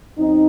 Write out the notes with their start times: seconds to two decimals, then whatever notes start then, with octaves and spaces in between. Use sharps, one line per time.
0.18 F#2 C4 D#4